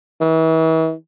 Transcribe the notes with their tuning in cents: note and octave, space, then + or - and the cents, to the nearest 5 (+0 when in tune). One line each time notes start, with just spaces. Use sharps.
E3 -40